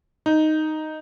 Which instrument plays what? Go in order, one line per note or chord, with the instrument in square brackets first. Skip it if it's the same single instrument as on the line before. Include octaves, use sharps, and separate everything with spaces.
[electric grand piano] D#4